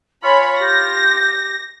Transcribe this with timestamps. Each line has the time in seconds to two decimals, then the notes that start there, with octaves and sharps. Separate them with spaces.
0.24 F4 C#5 G#5 B5
0.58 G4 A#6